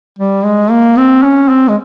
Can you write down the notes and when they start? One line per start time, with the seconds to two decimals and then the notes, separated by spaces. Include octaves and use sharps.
0.19 G3
0.45 G#3
0.71 A#3
0.97 C4
1.23 C#4
1.49 C4
1.68 G#3